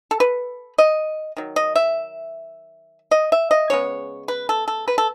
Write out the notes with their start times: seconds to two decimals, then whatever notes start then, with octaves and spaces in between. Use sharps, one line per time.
0.11 A4
0.20 B4
0.78 D#5
1.37 D#3 F#3
1.56 D#5
1.76 E5
3.11 D#5
3.32 E5
3.51 D#5
3.70 C#3 G#3 B3 C#5
4.28 B4
4.49 A4
4.68 A4
4.88 B4
4.98 A4